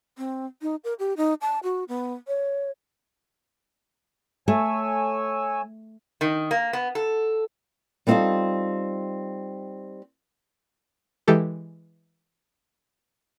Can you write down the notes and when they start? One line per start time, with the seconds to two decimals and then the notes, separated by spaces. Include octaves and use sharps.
0.18 C4
0.62 D#4
0.84 A#4
0.99 G4
1.17 D#4
1.41 A5
1.63 F#4
1.88 B3
2.28 C#5
4.48 A3 C#5 G#5 E6
6.21 D#3
6.51 A#3
6.73 B3
6.95 A4
8.07 G3 B3 C4 D#4 F4 A4
11.28 E3 G#3 G4 A4